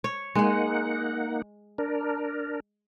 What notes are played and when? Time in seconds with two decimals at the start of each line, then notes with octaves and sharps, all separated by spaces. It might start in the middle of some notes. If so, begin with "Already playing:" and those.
0.04 C#5
0.35 G#3 A#3 D#4 G#4 F#5
1.78 D4 A#4